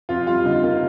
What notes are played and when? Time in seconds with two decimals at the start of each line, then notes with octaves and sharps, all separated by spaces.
0.09 F2 F4
0.27 G3 F4
0.45 D3 D#4
0.63 A#3 F4